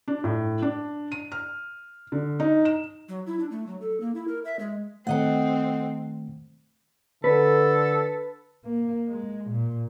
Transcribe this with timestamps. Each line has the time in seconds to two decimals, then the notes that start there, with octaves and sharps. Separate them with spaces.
0.08 D4
0.24 A2
0.62 D4
1.12 D#7
1.32 F6
2.12 D3
2.40 D#4
2.65 E7
3.09 F#3
3.27 E4
3.39 D4
3.51 A3
3.67 F#3
3.81 A4
4.00 A#3
4.15 E4
4.28 A#4
4.45 E5
4.59 G#3
5.07 D#3 A3 C4 A4 D#5 F#5
7.24 D3 A4 B4
8.65 A#3
9.09 G#3
9.51 A#2